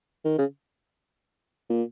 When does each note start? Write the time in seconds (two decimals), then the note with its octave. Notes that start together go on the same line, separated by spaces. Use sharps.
0.25 D#3
0.38 C#3
1.69 A#2